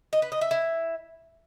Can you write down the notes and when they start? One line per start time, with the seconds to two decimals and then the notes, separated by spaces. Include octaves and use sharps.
0.13 D#5
0.22 B4
0.32 D#5
0.41 E5
0.51 E4